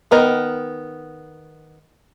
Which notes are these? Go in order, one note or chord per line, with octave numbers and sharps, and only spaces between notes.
D#3 B3 A#4 D#5